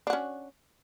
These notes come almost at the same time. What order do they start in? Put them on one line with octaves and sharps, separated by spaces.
D4 F#4 C#4